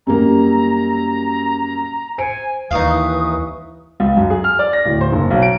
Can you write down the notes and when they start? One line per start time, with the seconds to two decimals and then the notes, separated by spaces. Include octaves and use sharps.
0.07 F#2 G3 A#3 A#5
2.18 C5 G#5 C#7 D7
2.71 D#2 E3 D#4 B4 F5 C#6 D#6
4.00 C#2
4.17 F#2
4.30 G#4
4.44 F6
4.59 D5
4.73 A#6
4.86 D1
5.01 C5
5.12 F#1
5.30 B1
5.42 D7